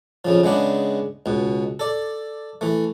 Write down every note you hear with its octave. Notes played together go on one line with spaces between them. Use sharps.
F2 C#3 F3
C#3 G#3 B3 D4
C#2 B2
A4 D5
E3 A3